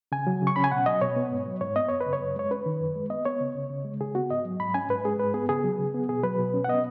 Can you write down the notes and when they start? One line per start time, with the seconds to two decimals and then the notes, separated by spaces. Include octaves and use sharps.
0.12 C#3 G#5
0.27 F#3
0.42 C#3
0.47 C#6
0.56 C#4 B5
0.64 G#5
0.72 B2 F#5
0.86 F#3 D#5
1.01 B2 C#5
1.16 B3
1.31 G#2
1.46 F#3
1.61 G#2 C#5
1.76 B3 D#5
1.89 F#2 C#5
2.01 B4
2.06 C#3
2.13 C#5
2.20 F#2
2.36 G#3 C#5
2.50 C#4 B4
2.66 D#3
2.80 F#2
2.96 G#3
3.10 B3 D#5
3.25 B3 C#5
3.41 C#3
3.55 C#3
3.70 C#3
3.85 G#3
4.00 C#3 G#4
4.15 B3 F#4
4.30 G#2 D#5
4.45 F#3
4.60 G#2 B5
4.74 C#4 G#5
4.89 G#2 B4
5.05 G#3 G#4
5.19 G#2 B4
5.34 B3 G#4
5.49 C#3 G#4
5.64 F#3
5.79 C#3
5.94 B3
6.09 B2 G#4
6.24 F#3 B4
6.39 B2
6.54 C#4
6.64 F#5
6.68 B3 D#5